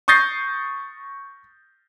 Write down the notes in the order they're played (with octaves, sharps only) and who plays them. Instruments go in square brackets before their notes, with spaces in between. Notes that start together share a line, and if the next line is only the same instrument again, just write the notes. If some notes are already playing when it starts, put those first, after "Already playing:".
[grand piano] C#6 D#6 G6 A6 A#6 C7